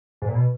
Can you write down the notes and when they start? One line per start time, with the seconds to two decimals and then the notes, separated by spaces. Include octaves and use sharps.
0.22 G#2
0.28 A#2
0.35 B2